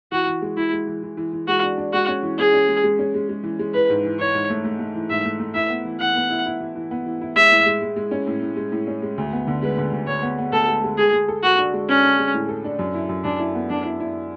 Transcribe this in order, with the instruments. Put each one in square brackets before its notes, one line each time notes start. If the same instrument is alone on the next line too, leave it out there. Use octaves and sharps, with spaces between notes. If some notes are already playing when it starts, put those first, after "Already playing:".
[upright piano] E3 [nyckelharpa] F#4
[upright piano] E3
G#3
[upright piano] E3 [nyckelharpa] E4
[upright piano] G#3
E3
E3
E3
E3
[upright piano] G#3 [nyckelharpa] F#4
[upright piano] D4
D4
[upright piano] G#3 [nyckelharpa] F#4
[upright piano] C#4
E3
[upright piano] C#4 [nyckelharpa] G#4
[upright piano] C#4
G#3
G#3
C#4
G#3
G#3
E3
G#3
[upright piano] E3 [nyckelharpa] B4
[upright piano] G#2
E3
[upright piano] E3 [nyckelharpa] C#5
[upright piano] G#2
A3
A3
A3
E3
[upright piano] G#2 [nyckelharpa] E5
[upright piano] A3
A3
[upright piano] E4 [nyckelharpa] E5
[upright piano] B3
E3
[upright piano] E3 [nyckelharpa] F#5
[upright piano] B3
E4
E4
E3
E3
B3
E3
E4
[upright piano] G#3 [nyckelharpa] E5
[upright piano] A2
G#3
G#3
G#3
C#4
A2
A2
G#3
A2
C#4
G#3
D2
B3
D3
[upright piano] G#3 [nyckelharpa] B4
[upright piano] D3
D2
[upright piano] D2 [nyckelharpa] C#5
[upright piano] B3
B3
[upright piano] D2 [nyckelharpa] A4
[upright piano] G#3
G#3
[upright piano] G#3 [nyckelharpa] G#4
[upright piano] G#3
A4
[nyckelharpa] F#4 [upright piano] A4
[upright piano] D4
G#3
[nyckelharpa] C#4 [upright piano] D4
[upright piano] D4
G#3
A2
A4
D4
F#2
E4
F#2
[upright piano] F#2 [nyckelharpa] D4
[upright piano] E4
B3
[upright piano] F#2 [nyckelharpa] D4
[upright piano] E4
E4